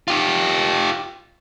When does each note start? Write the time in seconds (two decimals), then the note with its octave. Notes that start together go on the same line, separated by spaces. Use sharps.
0.08 F4 G4